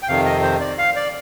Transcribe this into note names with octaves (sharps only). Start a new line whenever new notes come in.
G5
F2 C3 D#3 F5
D#5
C5
D5
F5
D5